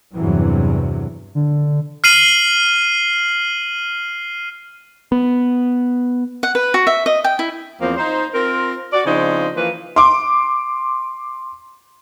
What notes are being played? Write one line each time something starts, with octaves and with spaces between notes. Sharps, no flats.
E2 G2 C3 E3 F#3
D3
F6 C7 D#7 F#7
B3
F#5
B4
F#4
E5
D#5
G5
E4
E2 F3 A#3 C4
D#4 C5
C4 F4 A#4
F#4 D5
C#3 F3 C4 D4 D#4
E3 F3 A#3 F4 B4
C6 D6